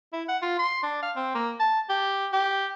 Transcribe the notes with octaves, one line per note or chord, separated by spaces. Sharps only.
E4
F#5
F4
C6
D4
F5
C4
A#3
A5
G4
G4